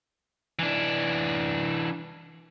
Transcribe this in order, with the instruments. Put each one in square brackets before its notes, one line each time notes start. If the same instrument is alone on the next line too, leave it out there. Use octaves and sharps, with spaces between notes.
[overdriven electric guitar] E3 D4